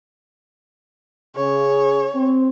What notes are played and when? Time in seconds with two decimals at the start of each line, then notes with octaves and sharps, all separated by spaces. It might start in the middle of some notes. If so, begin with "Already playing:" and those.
1.36 C#3 G#4 C#5
2.15 C4